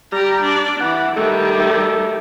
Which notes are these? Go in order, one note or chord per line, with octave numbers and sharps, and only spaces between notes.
G3 G4 A#5
D4 D5
E3 F#5
D#3 G3 A3
A3